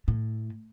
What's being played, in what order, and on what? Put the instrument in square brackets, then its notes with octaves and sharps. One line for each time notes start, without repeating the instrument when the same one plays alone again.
[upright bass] A2